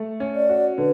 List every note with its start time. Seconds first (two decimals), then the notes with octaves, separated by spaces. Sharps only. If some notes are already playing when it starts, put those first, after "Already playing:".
Already playing: A3
0.20 C#4
0.36 D5
0.49 F#4
0.78 D3 B4